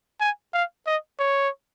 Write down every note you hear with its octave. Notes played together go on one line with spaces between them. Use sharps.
G#5
F5
D#5
C#5